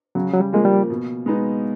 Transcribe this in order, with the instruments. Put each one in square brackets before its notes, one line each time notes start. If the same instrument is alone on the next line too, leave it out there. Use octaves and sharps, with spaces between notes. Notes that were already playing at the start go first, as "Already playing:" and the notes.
[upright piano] C#3 [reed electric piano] F#3
[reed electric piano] F#3
G3
[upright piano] F3 A#3 [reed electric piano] G#3
[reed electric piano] G3
[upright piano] B2
G#3 B3 D#4